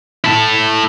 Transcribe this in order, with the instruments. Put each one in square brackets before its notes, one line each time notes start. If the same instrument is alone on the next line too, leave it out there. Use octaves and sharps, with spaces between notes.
[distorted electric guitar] E4 A4